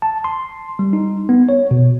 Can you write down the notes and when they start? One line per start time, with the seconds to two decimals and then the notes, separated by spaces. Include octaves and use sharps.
0.02 A5
0.24 C6
0.79 G3
0.93 D#4
1.29 B3
1.49 C#5
1.71 B2